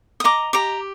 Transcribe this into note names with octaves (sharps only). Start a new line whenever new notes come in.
D#6
D#5 A#5 D6
G4 A#5 D6